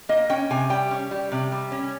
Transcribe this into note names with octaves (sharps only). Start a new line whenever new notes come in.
A#3 D#5
C#4 G5
C3 G#5
G3 G5
C#4
G3
C3
G3
C#4